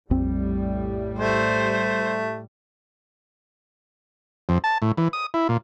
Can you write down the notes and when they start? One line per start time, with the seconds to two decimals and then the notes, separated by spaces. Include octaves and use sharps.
0.11 A#1 F2 A2 G3 C4
1.19 A3 C5
4.49 F2
4.64 A5
4.82 A2
4.97 E3
5.13 D#6
5.34 E4
5.49 A#2